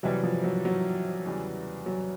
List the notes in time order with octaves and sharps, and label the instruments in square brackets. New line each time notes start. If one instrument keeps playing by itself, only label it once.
[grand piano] C3 E3 G3 [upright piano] F#3
[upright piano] F3
F#3
F#3
[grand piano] E2 C#3 E3 G3
[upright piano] F#3